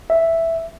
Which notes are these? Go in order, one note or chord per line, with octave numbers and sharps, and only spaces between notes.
E5